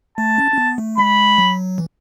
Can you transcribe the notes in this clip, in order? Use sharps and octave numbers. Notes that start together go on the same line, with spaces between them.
A3 A5
C#4
C#4
B3
A3
G#3 B5
F#3
E3